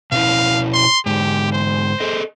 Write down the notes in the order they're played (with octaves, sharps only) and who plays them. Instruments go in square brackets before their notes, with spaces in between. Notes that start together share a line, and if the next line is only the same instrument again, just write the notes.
[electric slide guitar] B2 C#4 E4 [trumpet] F5
[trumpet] C6
[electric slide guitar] G#2 D3 G#3 [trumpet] G4
[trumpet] C5
[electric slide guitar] G#4 A4 D#5